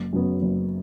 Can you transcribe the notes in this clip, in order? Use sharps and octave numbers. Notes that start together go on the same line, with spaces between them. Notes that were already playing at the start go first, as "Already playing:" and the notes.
Already playing: F#1
F#2 C#3 F#3 B3
F#1